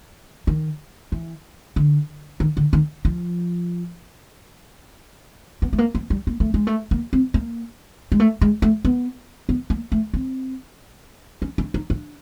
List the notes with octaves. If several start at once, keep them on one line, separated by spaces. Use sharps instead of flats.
D#3
E3
D3
D#3
D3
D#3
F3
B3
A3
A#3
A#3
G3
A#3
A3
G#3
A3
A#3
C4
A#3
G#3
A3
G#3
A3
B3
B3
A#3
A3
C4
C#4
D4
D#4
D4